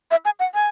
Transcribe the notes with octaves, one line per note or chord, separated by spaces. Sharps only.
E5
G#5
F#5
G#5